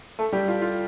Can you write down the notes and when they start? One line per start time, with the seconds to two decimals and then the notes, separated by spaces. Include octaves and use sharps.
0.19 A3 A4
0.32 G3 G4
0.48 F4
0.62 F4